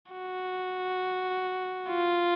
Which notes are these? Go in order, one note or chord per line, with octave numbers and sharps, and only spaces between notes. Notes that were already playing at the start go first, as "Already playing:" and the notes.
F#4
F4